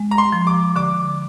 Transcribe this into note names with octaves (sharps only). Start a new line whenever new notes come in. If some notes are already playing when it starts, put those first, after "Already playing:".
Already playing: G#3
A#5
C6
F3
D6
D3 D6